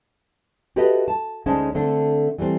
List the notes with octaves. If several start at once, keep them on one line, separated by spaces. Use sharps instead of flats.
F#4 G4 A4 B4 D#5 E5
A5
D2 G#3 C#4 D#4 C5 A5
D3 A3 C4 D4
E3 G3 A3 C4